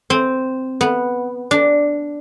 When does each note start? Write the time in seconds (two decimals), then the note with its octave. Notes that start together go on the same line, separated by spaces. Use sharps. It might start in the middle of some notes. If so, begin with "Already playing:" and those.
0.10 C4
0.81 B3
1.51 D4